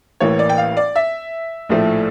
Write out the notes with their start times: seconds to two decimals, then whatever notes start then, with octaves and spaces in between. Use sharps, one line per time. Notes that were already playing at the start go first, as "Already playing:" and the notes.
0.20 A1 A2 E3 A#3 C#5
0.39 D5
0.49 G5
0.58 F5
0.77 D5
0.96 E5
1.69 A#1 A2 F3 A3